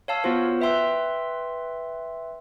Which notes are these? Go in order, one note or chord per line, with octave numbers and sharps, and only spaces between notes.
C#5 F5 A5 E6
B3 F4 F#4 C5
B4 E5 G5 C6 E6